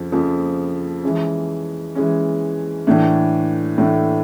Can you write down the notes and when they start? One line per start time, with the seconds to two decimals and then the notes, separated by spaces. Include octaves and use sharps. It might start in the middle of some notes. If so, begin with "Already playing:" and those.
Already playing: F2 C#3 F3
0.12 F2 C#3 F3
1.03 E3 G#3 C#4
1.95 E3 G#3 C#4
2.87 A2 E3 A3 D4
3.78 A2 E3 A3 D4